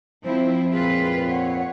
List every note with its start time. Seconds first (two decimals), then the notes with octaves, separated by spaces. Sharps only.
0.24 F3 C4 E4 C5
0.72 F2 A#2 C4 F4 G#4 B4
1.30 C#5 F#5